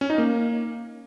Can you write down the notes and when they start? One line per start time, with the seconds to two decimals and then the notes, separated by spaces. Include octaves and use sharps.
0.01 C#4
0.10 D#4
0.18 A#3